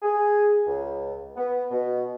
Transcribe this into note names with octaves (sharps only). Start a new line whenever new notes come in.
G#4
C#2
B3
B2